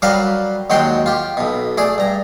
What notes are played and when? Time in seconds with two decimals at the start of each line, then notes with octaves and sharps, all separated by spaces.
0.02 F#3 G3 A#4 B4 F5 A5
0.70 D#2 F#3 G#3 F#4 G5 C6
1.06 F4 G4
1.37 B1 B2
1.78 A3 G#4 D5
1.98 G2 A#5